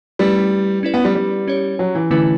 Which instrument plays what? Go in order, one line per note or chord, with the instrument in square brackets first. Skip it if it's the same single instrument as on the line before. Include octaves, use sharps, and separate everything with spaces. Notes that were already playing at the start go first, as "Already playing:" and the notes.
[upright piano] G3 [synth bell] A3 C#4 E4 B4
[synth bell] C#4 E4 B4 D5
[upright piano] B3
G3
G3
[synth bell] C#4 G4 C#5
[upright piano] F#3
E3
[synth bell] D3 A3 C#4 E4 B4 [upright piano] E3